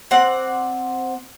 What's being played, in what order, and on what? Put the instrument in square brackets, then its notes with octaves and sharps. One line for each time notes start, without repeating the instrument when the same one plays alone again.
[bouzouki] C4 D5 F#5